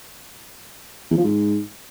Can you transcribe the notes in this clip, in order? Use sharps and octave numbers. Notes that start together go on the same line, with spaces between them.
E2
F3
G#2